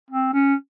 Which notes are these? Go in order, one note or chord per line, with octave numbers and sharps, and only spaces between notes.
C4
C#4